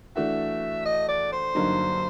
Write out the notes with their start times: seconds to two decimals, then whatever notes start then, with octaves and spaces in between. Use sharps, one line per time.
0.16 E3 A3 D4 F#4 E5
0.86 D#5
1.09 D5
1.32 C5
1.55 G2 D3 F#3 A#3 D#4